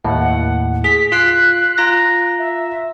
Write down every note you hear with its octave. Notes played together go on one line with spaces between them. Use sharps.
D#2 A2 F#5
G#4 B6
F4 F#6 B6 C7
F4 A#5 A#6
E5